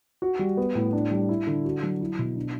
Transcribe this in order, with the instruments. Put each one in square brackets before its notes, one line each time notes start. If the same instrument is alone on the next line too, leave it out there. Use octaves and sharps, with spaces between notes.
[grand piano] F#4
G3
B3
A2
D4
G3
E4
D3
F#4
F#3
E4
B2
D4